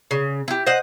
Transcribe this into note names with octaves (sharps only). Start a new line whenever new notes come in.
C#3
E4 G4
C5 D#5 F#5